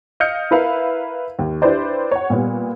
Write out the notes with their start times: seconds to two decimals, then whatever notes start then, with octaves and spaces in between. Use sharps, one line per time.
0.20 D#5 F5 F6 G6 C#7
0.51 E4 A#4 B4 E5 F5
1.39 D#2
1.62 D4 E4 G4 B4 C5 D5
2.11 C#5 F#5
2.30 A#2 G3 B3